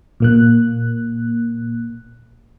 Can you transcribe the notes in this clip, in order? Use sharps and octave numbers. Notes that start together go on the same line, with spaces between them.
A#2 A#3 F#6